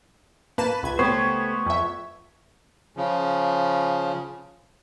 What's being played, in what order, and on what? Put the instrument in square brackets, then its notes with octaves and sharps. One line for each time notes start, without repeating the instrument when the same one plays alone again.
[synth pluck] A#3 A5 E7 [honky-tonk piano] B4
[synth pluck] C#2 G#6
[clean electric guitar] A3 G4 C5 [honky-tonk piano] B3 [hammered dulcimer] C#5
[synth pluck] F2 E5
[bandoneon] C#3 F3